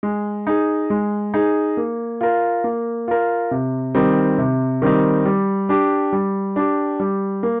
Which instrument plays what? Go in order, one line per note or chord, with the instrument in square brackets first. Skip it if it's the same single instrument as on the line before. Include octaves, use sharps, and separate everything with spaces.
[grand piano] G#3
D#4 G#4
G#3
D#4 G#4
A#3
F4 A#4
A#3
F4 A#4
C3
D#3 G3 C4 D#4
C3
D#3 G3 C4 D#4
G3
D4 G4
G3
D4 G4
G3
A#3